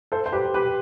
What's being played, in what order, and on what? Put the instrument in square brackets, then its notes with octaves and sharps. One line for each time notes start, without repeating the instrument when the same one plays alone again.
[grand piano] A4 C5
C5
G4 B4
G4 B4